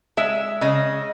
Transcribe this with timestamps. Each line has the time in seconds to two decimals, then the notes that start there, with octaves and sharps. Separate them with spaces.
0.17 G#3 E5
0.61 C#3 D#5